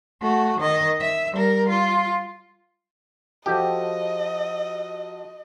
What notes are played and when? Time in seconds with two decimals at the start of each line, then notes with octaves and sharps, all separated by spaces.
0.21 A3 F#4
0.59 D#3 D#5
1.01 E5
1.33 G3 A#4
1.69 F4
3.46 F3 F#4 G4 A4 D#5